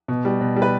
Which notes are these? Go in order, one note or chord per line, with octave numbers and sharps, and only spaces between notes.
B2
G3
B2
G3
B4